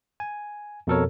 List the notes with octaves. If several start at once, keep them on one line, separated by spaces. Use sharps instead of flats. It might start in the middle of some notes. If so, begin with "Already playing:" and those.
G#5
F2 B2 A4 A#4 C#5